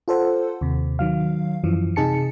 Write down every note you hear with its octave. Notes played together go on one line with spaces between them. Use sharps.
F4 A4 C5 F#5
D#2 C3
D#3 F#3 F5
F#2 E3 F3
C3 D#4 G#4 A5 C#7